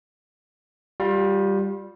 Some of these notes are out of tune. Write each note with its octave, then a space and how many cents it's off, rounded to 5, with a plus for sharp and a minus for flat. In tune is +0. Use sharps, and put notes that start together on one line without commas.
G3 +0 F4 +30